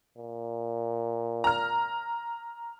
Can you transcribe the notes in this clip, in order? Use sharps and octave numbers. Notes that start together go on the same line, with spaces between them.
A#2
A#5 F6